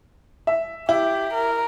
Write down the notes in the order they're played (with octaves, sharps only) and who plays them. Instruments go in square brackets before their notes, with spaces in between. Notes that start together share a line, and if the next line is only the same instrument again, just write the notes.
[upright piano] E5
[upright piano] E4 [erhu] G4
[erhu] A#4